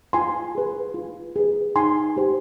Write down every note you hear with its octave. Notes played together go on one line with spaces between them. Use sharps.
F4 G#5 C6
G#4 B4
F4
G#4 B4
D#4 G#5 C6
G4 C5